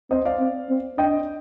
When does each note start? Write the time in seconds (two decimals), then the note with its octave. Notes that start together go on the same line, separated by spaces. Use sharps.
0.11 C4 C5 D#5
0.25 D5 F5
0.40 C4
0.70 C4
0.98 D4 D#5 G5